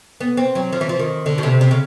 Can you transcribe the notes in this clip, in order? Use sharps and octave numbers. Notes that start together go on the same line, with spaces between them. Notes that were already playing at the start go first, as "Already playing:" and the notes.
B3
C4
F#3
F3
E3
F3
D#3
D3
B2
C3
C3
C#3